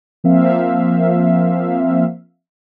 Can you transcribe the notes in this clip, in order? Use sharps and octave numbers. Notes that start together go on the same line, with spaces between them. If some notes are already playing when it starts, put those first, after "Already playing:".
F3 A#3 C4 E5 F5